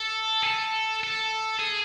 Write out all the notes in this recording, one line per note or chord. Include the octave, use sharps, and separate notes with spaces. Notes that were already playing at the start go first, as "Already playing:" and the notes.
Already playing: A4
G#4
A4
A4
G#4